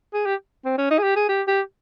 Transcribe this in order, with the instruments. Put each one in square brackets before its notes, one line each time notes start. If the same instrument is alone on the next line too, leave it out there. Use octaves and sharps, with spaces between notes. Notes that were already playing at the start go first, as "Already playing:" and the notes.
[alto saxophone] G#4
G4
C4
C#4
D#4
G#4
G4
G#4
G4
G4